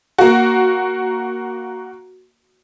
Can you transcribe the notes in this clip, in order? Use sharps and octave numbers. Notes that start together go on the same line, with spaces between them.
A#3 F#4